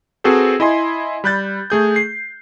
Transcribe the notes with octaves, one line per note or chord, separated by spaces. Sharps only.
C4 F#4 G#4 A4 B4 C5
E4 D#5 G#5 C6
G3 B5 F#6 G6 A6
A3 G#4 G6
C7